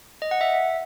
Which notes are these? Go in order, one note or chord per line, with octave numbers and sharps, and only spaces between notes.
D#5
F#5
E5